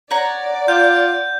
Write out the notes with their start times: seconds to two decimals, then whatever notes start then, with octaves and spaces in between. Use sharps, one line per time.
0.11 C#5 D5 F#5 A#5
0.68 F4 G6